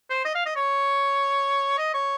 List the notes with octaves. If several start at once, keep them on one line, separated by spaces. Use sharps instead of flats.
C5
D#5
F5
D#5
C#5
D#5
C#5